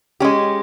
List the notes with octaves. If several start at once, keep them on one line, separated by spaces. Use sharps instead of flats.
G#3 C#4 G4